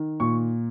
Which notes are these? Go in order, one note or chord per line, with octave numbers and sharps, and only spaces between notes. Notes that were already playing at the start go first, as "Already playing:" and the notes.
Already playing: D#3
A#2 C#6